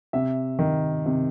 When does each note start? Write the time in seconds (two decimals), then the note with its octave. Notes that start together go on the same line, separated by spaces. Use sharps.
0.13 C3 E5
0.59 D#3
1.06 C3